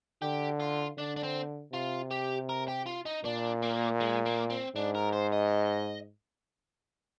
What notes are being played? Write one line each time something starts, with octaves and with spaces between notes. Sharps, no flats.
D3 G4
F4
D3 D4
D4
C4
C3 F4
G4
A#4
G4
F4
D#4
A#2 D4
A#3
G#3
A#3
C4
G#2 D4
A#4
C5
D#5